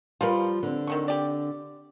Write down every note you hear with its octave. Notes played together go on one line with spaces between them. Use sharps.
F3 G3 F4 A#4 B4
D3 C4
D#3 F#3 C#6
G4 D5